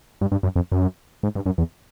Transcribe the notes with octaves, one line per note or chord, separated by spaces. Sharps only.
G2
G2
F#2
F2
F#2
G#2
G2
F#2
E2